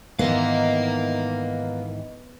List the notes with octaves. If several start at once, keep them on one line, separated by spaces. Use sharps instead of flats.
G#2 D#3 E3 B3 A#4 F5